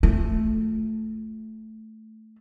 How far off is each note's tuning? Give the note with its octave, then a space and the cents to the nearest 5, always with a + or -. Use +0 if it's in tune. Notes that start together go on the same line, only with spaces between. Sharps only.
A3 +0 F4 +0